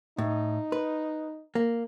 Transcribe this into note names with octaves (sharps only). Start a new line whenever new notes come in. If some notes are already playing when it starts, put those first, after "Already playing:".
A2 D#4
B4
A#3